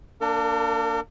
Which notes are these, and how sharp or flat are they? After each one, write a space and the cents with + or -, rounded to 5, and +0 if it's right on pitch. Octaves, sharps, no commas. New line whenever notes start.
A#3 +0 D4 +0 A#4 -45